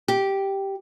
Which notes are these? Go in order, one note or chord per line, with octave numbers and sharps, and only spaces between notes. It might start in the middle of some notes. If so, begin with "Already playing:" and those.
G4